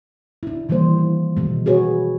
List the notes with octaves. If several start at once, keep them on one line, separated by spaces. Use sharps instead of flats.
D4 E4
D#3 E3 G3 A#3 C5
E3
B2 D#3 G3 G#3
F#4 G#4 B4 C#5